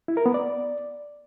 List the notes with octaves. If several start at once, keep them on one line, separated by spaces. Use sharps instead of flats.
E4
A#4
B3
D5